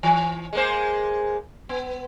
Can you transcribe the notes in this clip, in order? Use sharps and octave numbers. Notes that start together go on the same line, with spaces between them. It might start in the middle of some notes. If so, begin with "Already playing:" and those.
E3
G#3 A#3 C5
B3